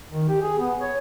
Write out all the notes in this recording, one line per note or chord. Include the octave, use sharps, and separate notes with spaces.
D#3
G4
G#4
B3
C#5